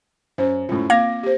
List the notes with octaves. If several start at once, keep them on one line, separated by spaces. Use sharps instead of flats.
F#2 C5
F#2 A2 F4
A#3 C4 F5 D6 G#6 A#6
G4 C5